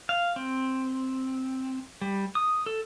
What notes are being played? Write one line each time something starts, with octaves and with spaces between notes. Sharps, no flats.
F5
C4
G3
D#6
A4